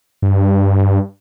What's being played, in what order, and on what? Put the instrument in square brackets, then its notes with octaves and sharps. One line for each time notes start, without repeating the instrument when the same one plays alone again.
[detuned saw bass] G2